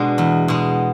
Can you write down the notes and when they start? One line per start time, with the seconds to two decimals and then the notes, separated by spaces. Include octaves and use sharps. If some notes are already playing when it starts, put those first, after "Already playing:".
Already playing: B2 G#3 D4
0.18 E2
0.48 B2 G#3